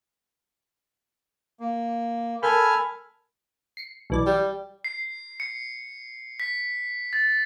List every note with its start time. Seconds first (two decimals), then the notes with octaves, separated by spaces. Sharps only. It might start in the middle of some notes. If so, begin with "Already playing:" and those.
1.60 A#3
2.43 A4 A#4 G#5 B5 F6
3.77 C7 C#7
4.10 B1 E3 D5
4.26 G3
4.84 C7
5.40 C#7
6.40 B6
7.13 A6